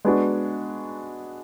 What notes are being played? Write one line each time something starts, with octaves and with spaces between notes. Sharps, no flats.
G#3 B3 D4 F#4